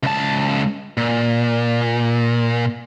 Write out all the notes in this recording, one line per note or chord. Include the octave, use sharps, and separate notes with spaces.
C#2 A5
A#2